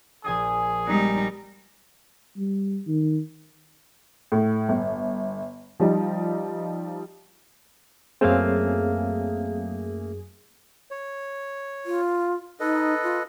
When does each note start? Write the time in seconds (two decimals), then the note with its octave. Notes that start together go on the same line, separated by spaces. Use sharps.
0.24 A#1 G#4 G#5 D#6
0.87 G3 G#3 B3 D#4
2.37 G3
2.87 D#3
4.32 A2
4.69 G1
5.80 F3 G3 D#4
8.21 F#2 A3 A#3 C4 G#4 C#5 F5
10.91 C#5
11.86 F4
12.60 D#4 A4 B4 D#5
13.03 F4